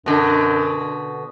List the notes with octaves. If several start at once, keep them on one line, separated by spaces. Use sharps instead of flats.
F#2 B2 D3